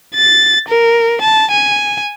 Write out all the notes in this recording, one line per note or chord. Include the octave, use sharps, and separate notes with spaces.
A6
A#4
A5
G#5